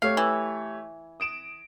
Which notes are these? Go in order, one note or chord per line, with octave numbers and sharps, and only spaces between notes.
A3 G4 C#5 F5
E3
D#6 D7 E7